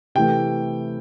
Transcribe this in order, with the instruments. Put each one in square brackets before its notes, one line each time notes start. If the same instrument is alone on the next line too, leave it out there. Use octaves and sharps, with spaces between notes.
[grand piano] C3 E3 A3 G5